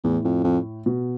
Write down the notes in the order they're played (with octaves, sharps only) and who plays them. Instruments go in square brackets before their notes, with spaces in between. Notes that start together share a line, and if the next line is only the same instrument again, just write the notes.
[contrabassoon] E2 [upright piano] A2
[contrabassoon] F2
F2
[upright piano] B2